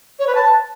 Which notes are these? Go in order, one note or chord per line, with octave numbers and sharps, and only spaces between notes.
C#5
B4
A5